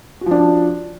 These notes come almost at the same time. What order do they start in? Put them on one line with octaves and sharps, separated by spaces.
F#4 F3 D4